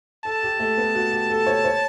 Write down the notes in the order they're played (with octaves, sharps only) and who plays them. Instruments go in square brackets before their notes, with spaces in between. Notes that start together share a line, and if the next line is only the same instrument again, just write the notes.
[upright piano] A4 [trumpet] A5
[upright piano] G4
A3
B3
F#4
G4
A4
C#5
C#5